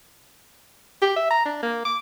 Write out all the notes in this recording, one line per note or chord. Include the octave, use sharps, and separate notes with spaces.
G4
E5
A#5
D4
A#3
D6